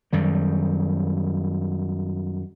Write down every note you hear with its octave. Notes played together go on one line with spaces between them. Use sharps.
F#2 D#3 G3